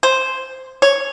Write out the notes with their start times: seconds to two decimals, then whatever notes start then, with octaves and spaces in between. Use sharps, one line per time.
0.03 C5
0.82 C#5